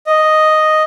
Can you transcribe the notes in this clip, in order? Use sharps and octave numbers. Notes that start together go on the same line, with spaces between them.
D#5